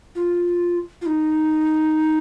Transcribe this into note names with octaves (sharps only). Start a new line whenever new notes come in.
F4
F4
D#4